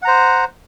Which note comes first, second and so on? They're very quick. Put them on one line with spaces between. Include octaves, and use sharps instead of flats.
F#5 A#5 C5